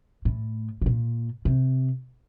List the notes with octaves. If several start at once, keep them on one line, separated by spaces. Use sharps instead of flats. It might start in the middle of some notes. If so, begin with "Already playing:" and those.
A2
C3
A#2
C3